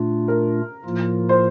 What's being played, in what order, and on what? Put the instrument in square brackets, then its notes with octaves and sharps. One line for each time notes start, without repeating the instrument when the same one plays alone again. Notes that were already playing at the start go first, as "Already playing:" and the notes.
Already playing: [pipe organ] A#2 A3 D4 F4
[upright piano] A#4
[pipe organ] A2 F3 A#3 F4
[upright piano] C5